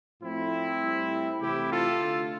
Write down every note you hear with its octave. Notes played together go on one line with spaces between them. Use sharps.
A2 F3 A3 C4 E4
A2 G3
C3 E3 A3 E4 G4
F4 A4
D3 A3